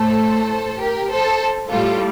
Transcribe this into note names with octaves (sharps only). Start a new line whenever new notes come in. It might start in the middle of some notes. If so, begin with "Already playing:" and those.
Already playing: A2 A3 A4 C5
G4 A#4
A4 C5
A2 G3 F4 A4